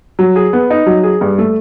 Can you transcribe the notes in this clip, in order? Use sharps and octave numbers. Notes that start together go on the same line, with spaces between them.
F#3
G#4
B3
D#4
F#3
G#4
G2
A3